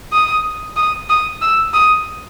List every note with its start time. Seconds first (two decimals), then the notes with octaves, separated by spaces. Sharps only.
0.12 D#6
0.76 D#6
1.09 D#6
1.41 E6
1.74 D#6